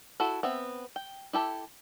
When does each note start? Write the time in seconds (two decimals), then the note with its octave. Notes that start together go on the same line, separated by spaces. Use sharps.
0.20 E4 F#4 A4
0.43 B3 C4 E5
0.96 G5
1.33 E4 G4 A4